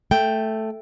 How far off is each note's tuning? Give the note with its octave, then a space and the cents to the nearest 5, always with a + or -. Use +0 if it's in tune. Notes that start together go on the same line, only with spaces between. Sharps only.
A3 +0 G5 +0